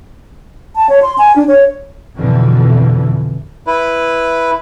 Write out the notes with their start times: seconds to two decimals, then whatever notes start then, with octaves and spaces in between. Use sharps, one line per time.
0.76 A5
0.89 C#5
1.02 C6
1.18 G#5
1.36 D4
1.48 C#5
2.16 F2 B2 D3 E3
3.67 E4 B4